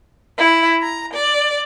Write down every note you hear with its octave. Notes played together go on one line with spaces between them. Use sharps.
E4
A#5
D5